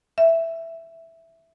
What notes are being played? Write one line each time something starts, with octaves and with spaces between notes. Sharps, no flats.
E5